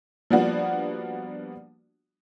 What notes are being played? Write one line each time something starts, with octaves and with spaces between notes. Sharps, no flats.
F3 G3 A#3 B3 D4 F#4